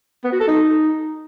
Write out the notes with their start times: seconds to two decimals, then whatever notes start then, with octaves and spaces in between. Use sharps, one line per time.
0.24 B3
0.32 F#4
0.40 A4
0.48 D#4